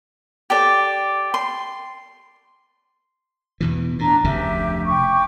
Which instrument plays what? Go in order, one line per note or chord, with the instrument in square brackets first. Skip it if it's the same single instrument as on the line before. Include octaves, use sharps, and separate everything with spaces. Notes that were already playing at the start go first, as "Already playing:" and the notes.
[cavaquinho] G4 A4 D5
C6
[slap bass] E2 B2 E3
[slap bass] A2 [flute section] D4 A#5
[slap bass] F1 D2 C#3 [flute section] G4 E5
[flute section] G5 C#6 D6